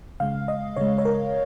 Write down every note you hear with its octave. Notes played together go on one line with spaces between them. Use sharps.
C#3 G#3 F5
D#5
C#3 G#3 C#5
C#5
A#4